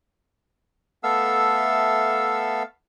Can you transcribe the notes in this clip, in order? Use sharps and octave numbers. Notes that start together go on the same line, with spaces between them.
A3 B3 A4 E5 F5 E6